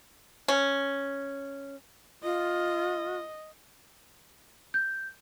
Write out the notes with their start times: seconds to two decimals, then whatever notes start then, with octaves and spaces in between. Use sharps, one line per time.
0.48 C#4
2.23 F4 D#5
4.74 G6